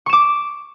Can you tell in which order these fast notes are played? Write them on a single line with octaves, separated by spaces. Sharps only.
C#6 E7 D6